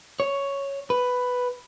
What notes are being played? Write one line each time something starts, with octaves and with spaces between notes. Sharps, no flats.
C#5
B4